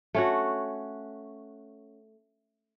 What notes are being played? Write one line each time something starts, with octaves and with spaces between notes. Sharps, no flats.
A3 C#4 F#4